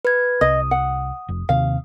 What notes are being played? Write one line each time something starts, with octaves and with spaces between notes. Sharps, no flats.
B4 G#6
C2 D#5 D#6
F#5
F1
D#2 C3 F5